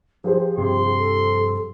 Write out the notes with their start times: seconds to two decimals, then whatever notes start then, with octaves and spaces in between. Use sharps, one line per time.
0.24 F3 G4 G#4 C5
0.58 G2 C3 C6
0.97 A4